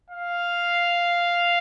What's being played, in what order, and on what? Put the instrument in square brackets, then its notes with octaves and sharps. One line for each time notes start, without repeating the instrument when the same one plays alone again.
[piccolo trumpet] F5